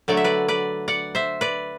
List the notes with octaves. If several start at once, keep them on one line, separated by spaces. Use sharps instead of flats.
D3 F#3 A3 D5
E5
B4 D5
B4 D5
D5 F#5
C5 E5
B4 D5